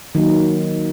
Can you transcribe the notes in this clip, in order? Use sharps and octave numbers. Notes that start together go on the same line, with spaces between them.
D#3 F#3 A#3 D#4